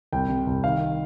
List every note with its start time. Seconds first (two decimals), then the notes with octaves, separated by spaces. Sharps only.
0.12 C2 G5
0.29 C3
0.47 C2
0.64 D#3 F5